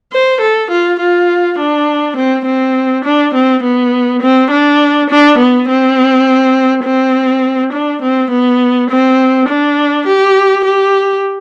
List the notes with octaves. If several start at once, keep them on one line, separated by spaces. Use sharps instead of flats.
C5
A4
F4
F4
D4
C4
C4
D4
C4
B3
C4
D4
D4
B3
C4
C4
D4
C4
B3
C4
D4
G4
G4